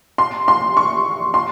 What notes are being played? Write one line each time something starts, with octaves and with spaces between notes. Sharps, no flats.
C6
C6
C#6
C6